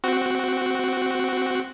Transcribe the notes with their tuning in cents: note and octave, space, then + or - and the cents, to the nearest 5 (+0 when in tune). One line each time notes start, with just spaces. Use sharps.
C4 -10 F#4 +0